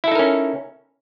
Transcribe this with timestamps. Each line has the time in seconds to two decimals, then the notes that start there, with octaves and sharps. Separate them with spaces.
0.04 E4
0.08 A4
0.12 D#4
0.15 A#4
0.19 C#4